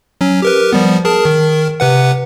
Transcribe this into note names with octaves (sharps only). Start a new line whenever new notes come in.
F#3 C#4
G4 A#4 B4
F3 G3 B3
G#4 A#4 A5
D#3 A#4
C3 B4 F#5